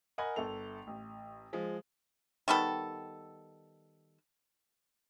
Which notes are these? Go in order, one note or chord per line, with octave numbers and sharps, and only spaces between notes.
A#4 D#5 F#5 G#5 B5
G1 A4 F7
A1
F3 G#3
D#3 G3 B3 A4